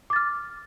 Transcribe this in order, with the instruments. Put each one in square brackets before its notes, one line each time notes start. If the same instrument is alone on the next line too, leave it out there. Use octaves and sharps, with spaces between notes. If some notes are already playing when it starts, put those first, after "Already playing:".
[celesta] D6
A6
F6